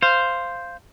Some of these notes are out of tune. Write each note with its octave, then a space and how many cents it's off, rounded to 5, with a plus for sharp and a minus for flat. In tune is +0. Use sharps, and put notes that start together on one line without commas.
C5 +0 F5 -10